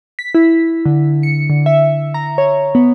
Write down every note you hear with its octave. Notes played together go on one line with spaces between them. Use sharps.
B6
E4
D3
C#7
D3
E5
A#5
C#5
B3